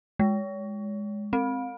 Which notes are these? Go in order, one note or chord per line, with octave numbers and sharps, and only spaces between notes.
G#3
C4